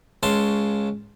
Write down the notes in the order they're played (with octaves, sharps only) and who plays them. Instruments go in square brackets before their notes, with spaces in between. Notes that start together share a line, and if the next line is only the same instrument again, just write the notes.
[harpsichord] C#2 C#3 A5 C6